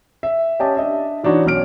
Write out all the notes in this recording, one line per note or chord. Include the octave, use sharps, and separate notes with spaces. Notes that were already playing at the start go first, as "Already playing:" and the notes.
E5
C#4 G4 D#5 A5
D4 D#5 E5
E3 D4 D#4 F#4 C#5
B1 C#4 F6 D7